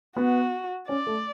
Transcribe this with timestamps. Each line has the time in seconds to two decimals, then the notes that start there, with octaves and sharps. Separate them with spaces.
0.16 B3 F#4
0.89 C#4 D5
1.07 A3